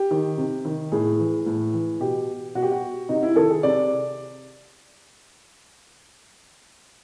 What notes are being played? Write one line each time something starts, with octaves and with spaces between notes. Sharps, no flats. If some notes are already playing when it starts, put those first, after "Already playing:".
Already playing: G4
D#3
C3
D#3
A2 G#4
E3
A2
E3
B2 G4
B2 F#4
G4
F#4
C3 D#4
E4
D#3 A4
G#4
C3 D5